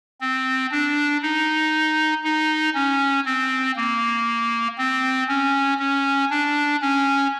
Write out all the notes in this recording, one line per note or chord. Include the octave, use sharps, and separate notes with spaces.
C4
D4
D#4
D#4
C#4
C4
A#3
C4
C#4
C#4
D4
C#4